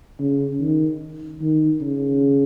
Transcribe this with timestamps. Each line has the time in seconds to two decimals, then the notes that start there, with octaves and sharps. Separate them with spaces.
0.20 C#3
0.60 D#3
1.41 D#3
1.81 C#3